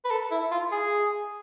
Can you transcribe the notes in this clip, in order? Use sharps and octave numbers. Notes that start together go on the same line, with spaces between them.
B4
A4
E4
F4
G#4